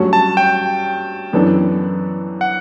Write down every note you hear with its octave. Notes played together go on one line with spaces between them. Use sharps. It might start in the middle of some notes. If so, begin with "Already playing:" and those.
Already playing: G2 F#3 A3 C#4 F#4
A5
G5
F#2 E3 B3 D4 A4
F#5